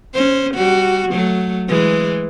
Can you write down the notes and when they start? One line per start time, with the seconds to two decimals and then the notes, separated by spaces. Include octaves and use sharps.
0.14 C#4 C5
0.54 G3 F#4
1.09 F#3 A3
1.68 E3 G#3